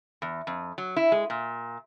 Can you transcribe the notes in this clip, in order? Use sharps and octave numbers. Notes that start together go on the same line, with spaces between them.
E2
F2
F#3
E4
G#3
A#2